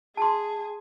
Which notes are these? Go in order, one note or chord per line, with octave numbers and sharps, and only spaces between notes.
G#4 A5 C6